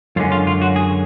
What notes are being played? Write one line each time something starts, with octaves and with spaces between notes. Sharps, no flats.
F#2 D3 G#3 C#4 F4
F4
F4
F#4
G#4